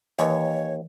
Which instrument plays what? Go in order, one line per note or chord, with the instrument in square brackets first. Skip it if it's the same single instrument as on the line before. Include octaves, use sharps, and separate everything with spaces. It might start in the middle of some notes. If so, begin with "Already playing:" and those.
[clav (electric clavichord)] D#2 [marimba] E3 [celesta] B4 D#5 G#5 [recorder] C#5